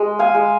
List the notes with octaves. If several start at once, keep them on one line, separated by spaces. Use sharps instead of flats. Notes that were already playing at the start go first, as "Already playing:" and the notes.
Already playing: G#3
F5 G#5
G#3